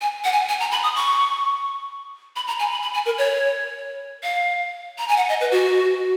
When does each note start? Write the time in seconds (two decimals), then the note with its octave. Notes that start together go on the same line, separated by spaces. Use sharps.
0.01 G#5
0.24 F#5
0.32 G#5
0.49 G#5
0.60 A#5
0.72 B5
0.83 D#6
0.96 C#6
2.36 B5
2.47 A#5
2.59 G#5
2.71 B5
2.82 B5
2.94 G#5
3.06 A#4
3.18 C#5
4.23 F5
4.98 A#5
5.08 G#5
5.17 F#5
5.29 D#5
5.40 B4
5.52 F#4